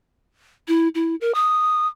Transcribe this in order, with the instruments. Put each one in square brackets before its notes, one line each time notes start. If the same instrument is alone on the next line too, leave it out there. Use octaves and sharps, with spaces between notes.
[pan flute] E4
E4
A#4
D#6